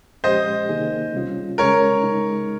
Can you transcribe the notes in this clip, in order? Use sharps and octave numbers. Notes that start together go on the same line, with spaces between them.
A#2 F3 G#3 C#4 G4 C5 D#5
C3 D#3 A#3 D#4 G#4
C3 G3 C#4 F4
C#3 G#3 C#4 G#4 A#4 C#5
C#3 G#3 D#4